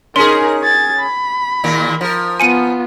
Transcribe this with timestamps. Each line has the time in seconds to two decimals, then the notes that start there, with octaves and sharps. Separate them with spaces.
0.16 C#4 D#4 G#4 A#4 C6
0.63 G#6 A6
1.00 B5
1.64 D#2 A#2 A#3
2.01 F3 A#4
2.40 B3 F4 G#5 C#7 D#7